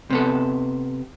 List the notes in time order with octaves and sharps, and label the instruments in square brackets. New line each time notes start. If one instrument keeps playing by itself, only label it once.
[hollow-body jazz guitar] C3 B3 A4